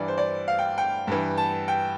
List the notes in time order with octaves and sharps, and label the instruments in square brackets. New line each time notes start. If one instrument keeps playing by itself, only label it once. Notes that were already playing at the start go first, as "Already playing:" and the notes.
Already playing: [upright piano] G2 E3 D5
C5
D5
F5
G5
G5
G2 E3
A5
G5